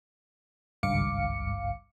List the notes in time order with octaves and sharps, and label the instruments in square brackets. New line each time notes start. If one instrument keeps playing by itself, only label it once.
[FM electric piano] G#1 C#2 G2 F5 D6 C#7